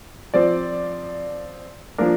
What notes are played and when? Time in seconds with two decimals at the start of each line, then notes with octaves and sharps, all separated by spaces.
0.34 F3 C4 D5
1.98 F3 A#3 D4 A#4